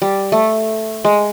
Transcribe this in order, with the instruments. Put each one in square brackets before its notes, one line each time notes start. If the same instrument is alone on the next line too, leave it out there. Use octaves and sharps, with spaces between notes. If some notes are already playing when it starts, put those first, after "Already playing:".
[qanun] G3
A3
G#3